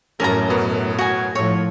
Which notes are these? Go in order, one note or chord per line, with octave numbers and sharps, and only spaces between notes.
A1 F#2 A2 C#4 A#4 A5 A#5
B2 B3
F#4 G#5
A2 F3 C#5